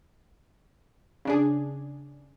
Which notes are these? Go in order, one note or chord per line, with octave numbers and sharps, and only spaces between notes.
C#3 D4 G#4